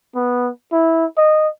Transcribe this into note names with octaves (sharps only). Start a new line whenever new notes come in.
B3
E4
D#5